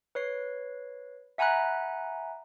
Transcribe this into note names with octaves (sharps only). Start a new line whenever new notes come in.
B4 C#5 C7
E5 F#5 G#5 A#5 B5 F#6